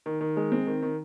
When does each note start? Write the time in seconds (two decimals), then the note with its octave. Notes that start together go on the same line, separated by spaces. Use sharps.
0.06 D#3
0.21 D#3
0.36 G#3
0.52 C4
0.67 D#3
0.82 D#3